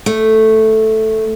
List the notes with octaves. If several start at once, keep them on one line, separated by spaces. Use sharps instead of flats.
A3